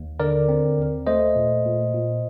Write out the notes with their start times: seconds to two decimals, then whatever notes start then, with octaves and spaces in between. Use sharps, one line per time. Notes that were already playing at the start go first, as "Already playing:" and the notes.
Already playing: D#2
0.20 D3 A#4 D5
0.48 C4
0.78 D#2
1.07 A3 C5 D#5
1.36 A#2
1.65 A#2
1.94 A#2